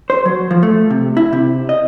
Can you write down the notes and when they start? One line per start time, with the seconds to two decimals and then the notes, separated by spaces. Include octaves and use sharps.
0.10 C5
0.25 F#3
0.51 F3
0.63 A3
0.90 C3
1.17 E4
1.33 C3
1.69 D#5